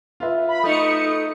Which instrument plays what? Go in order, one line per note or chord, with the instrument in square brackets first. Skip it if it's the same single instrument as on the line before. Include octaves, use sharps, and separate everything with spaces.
[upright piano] F4 B4 E5
[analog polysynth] B5
[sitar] A3 D#4 [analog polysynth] D#6 C#7